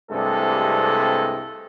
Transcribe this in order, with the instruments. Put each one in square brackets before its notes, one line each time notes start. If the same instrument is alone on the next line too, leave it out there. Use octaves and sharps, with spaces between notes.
[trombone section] C2 G2 C3 G#3 A3 A4